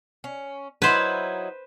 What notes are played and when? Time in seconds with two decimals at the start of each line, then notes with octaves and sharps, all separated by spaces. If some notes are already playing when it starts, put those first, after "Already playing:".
0.24 C#4
0.82 F#3 D#4 E4 B4 C5